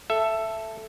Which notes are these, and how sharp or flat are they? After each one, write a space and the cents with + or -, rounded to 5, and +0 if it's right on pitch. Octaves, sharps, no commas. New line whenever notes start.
A4 +0 E5 +10